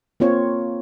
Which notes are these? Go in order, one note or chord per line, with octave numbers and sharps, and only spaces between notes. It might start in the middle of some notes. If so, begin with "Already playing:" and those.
A#3 C4 F4 C#5